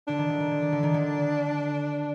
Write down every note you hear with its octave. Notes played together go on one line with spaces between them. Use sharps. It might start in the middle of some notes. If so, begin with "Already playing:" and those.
D3 D4
D#3
D3
D#3
D3
D#3
D3
D#3
D3